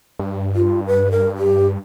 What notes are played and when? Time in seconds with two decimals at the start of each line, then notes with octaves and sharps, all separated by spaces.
0.19 G2
0.55 F4
0.87 B4
1.11 A#4
1.37 G4